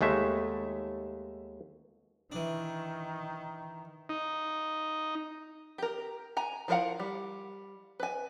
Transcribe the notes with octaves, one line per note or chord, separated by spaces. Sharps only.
D#2 G#3 A3 E5
D#3 E3 D4
D#4
G4 A#4
G#5 A#5
F3 E4 A#4 F5 F#5
G3
B4 G#5